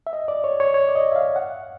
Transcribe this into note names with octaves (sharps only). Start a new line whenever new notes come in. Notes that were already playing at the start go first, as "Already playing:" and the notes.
E5
D#5
D5
C#5
C#5
C#5
D5
D#5
E5
F5
F#5